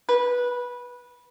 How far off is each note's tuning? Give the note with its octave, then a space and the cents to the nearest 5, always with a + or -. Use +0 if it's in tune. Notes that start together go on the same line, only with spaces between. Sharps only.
B4 -15